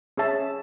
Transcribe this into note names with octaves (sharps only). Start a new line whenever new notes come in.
C#4 G#4 C#5 E5 A5